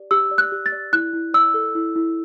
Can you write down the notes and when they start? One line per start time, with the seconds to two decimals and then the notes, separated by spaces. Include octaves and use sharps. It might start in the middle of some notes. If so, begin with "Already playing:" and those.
Already playing: G4 D5
0.11 G4 E6
0.31 D5
0.38 F#6
0.52 G4
0.66 A6
0.72 D5
0.93 E4 F#6
1.13 E4
1.34 D5 E6
1.54 A4
1.75 E4
1.96 E4